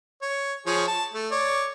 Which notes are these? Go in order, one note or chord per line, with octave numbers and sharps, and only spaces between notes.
C#5
F3 G#4 C#5
A5
A3
C#5 D5